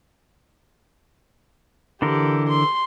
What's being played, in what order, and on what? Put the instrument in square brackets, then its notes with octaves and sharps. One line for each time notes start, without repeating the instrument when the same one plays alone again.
[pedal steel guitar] D3 E3 A#4 [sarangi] G4
[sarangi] C6